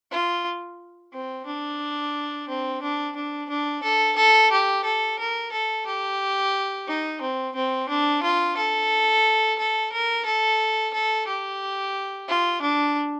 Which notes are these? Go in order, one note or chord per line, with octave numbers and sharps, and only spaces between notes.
F4
C4
D4
C4
D4
D4
D4
A4
A4
G4
A4
A#4
A4
G4
D#4
C4
C4
D4
F4
A4
A4
A#4
A4
A4
G4
F4
D4